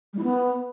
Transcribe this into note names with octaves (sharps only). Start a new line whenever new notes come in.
G3
E4
B3